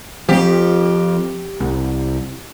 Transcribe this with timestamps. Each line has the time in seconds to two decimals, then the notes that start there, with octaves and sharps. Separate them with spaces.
0.29 F3 C4 G4
1.60 C2